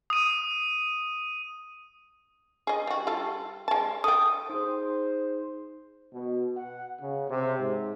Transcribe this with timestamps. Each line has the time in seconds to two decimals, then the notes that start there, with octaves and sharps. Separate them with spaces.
0.10 D#6 D#7
2.67 G#4 D#5
2.87 G3 F#4
3.07 G3 F4 A4
3.68 G#3 A5
4.04 A4 G5 D#6
4.50 D#4 G#4 C5
6.13 B2
6.56 F#5
7.00 C#3
7.30 C3
7.59 G#2